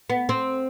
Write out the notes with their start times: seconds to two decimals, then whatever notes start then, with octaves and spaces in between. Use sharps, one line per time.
0.10 B3
0.29 C4